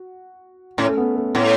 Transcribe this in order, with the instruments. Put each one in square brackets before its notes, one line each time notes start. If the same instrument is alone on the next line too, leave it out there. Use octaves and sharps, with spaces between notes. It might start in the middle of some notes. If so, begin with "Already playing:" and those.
Already playing: [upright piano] F#4
[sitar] A2 [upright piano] C#4
[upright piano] A3
B3
A3
[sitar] A2 [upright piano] B3